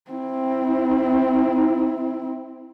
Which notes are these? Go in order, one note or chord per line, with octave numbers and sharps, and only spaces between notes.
C4 E4